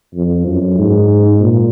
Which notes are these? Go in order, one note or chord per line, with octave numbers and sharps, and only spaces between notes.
F2
F#2
G#2
A#2